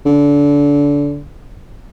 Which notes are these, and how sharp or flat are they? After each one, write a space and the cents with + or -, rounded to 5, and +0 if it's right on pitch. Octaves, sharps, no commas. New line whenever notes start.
D3 -25